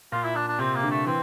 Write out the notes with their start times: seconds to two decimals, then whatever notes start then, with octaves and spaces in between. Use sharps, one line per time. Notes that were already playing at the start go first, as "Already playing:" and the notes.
0.12 A#2 F4
0.24 E4
0.35 D4
0.48 D4
0.59 C3 C4
0.75 A#3
0.83 D3
0.91 A3
1.06 E3 C4